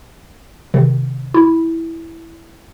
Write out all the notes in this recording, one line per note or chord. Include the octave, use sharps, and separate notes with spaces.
C3 D#3
E4